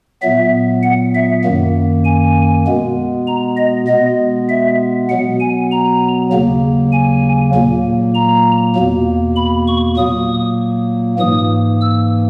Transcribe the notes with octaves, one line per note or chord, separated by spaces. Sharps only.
A#2 F#3 B3 E5
F#5
E5
F#2 D#3 A#3
G#5
B2 G#3 B3
A#5
D#5
B2 G#3 B3 D#5
E5
B2 F#3 B3 F#5
G#5
A#5
D#2 C#3 F#3 A#3
G#5
A#2 F#3 A#3
A#5
E2 B2 A#3
B5
C#6
A#2 F#3 A#3 D#6
G#2 E3 A#3 D#6
E6